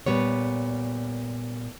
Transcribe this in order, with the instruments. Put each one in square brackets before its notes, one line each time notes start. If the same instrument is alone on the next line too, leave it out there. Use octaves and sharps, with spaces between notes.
[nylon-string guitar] A#2 G3 B3 C#5